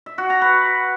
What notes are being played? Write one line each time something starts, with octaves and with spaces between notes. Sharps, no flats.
E5
F#4
A#5
B4